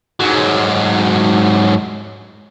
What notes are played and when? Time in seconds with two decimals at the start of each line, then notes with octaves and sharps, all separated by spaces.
0.20 G#2 F#3